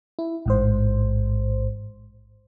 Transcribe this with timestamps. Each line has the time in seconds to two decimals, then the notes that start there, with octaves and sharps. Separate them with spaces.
0.19 E4
0.46 A1 G#2 C5